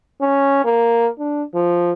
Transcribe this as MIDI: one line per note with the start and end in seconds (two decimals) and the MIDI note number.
0.21 0.63 61
0.65 1.08 58
1.19 1.43 62
1.54 1.92 53